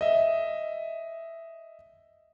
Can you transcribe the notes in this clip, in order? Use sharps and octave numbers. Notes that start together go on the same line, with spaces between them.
D#5 E5